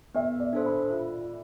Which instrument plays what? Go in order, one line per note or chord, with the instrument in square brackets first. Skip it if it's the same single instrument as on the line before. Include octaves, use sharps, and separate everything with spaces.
[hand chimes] B3 [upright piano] E5
[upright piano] D5
[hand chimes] D4 A4 C5
[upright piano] B5
[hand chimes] F4